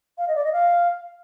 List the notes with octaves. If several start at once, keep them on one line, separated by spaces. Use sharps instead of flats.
F5
D#5
D5
D#5
F5